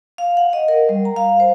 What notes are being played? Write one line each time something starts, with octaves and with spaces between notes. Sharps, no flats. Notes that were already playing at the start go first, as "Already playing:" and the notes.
F5
F#5
D#5
A#4
G3
A#5
F5
C5